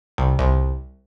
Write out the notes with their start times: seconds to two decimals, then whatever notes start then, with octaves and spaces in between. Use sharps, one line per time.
0.18 C2
0.39 C2